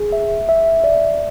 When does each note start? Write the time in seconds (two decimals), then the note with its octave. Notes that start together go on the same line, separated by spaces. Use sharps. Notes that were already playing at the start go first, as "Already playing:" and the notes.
Already playing: G#4
0.13 E5
0.49 E5
0.84 D5